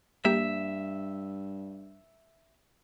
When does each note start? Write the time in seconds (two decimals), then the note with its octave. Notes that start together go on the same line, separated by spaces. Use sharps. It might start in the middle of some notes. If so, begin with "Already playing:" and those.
0.25 G2 G3 A#3 G4 E5